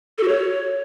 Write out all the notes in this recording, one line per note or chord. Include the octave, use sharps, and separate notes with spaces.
A4
F#4
C#5